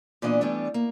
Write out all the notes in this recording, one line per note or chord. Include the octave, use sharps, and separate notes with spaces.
A#2 E3 B3 D4 D#5
E3 G3 A3 B3 D4
A#3